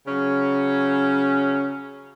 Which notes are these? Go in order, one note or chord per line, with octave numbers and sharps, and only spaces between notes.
C#3 F#3 C#4